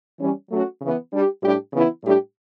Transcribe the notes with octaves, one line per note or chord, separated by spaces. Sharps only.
E3 G3 C#4
F#3 A3 C#4 F#4 A4
C#3 E3 B3
G3 D4 G4
A2 G3 D4 G4
C#3 E3 B3 E4
A2 G3 D4 G4